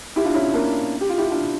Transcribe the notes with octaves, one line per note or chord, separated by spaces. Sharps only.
E4 G4
D4 F4
C#4 E4
A#3 D4
G4
F4
E4 G4
D4 F4